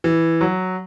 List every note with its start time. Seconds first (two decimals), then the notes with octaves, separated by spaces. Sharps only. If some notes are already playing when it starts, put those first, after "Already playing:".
0.04 E3
0.41 F#3